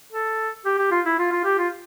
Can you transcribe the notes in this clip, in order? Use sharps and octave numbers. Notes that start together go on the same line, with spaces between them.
A4
G4
G4
F4
E4
F4
F4
G4
F4